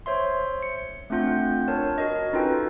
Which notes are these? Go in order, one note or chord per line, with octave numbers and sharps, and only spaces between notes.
C5 C#5 E5 C6
C#7
A3 C4 D4 F4 F#5 G6
D4 A#4 C#5 A5
F#4 A#4 D#5
C#4 D#4 F4 A4 B4 G5